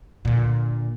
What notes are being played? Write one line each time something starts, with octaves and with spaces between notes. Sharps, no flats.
A#2 D3